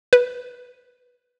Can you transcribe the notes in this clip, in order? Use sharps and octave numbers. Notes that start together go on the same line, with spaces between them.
B4